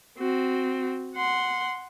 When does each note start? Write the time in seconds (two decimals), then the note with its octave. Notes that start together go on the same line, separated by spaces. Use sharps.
0.18 C4 F#4
1.15 F#5 C6